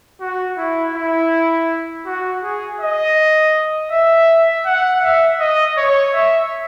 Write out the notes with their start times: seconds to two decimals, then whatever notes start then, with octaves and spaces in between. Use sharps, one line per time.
0.20 F#4
0.57 E4
0.95 E4
2.06 F#4
2.43 G#4
2.80 D#5
3.92 E5
4.66 F#5
5.02 E5
5.40 D#5
5.77 C#5
6.14 E5